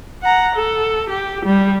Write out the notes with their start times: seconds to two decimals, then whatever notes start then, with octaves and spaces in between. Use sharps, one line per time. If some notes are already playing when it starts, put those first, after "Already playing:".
0.22 F#5 A#5
0.55 A4
1.09 G4
1.45 G3